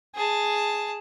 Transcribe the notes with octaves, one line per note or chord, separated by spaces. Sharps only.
G#4 A5